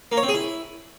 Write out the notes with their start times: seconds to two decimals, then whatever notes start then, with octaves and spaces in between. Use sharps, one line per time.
0.12 A#3
0.17 C#5
0.23 C4
0.28 G#4
0.34 E4